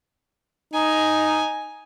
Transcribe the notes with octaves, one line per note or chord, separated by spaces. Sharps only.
D#4 G#5